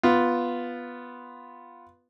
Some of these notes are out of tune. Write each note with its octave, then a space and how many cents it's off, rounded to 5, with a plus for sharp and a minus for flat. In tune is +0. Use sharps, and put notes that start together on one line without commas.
B3 +0 F4 +0